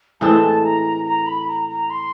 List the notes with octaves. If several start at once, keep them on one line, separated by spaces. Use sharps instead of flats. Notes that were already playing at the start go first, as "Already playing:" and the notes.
A2 E3 G#3 C4 A5
A#5
A#5
B5
A#5
A#5
C6